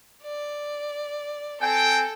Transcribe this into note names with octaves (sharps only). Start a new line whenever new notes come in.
D5
C4 A4 G5 G#5